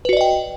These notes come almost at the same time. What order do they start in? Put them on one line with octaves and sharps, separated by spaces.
B4 F#4 D5 D#5 G5